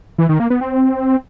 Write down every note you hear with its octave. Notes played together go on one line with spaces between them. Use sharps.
E3
D#3
A#3
B3
C4